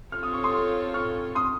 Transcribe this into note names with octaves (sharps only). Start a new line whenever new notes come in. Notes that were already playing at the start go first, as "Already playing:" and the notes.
C4 F4 A4 C#5 F6
D#6
C#6
C6 D#6
C#6 F6
C6 D#6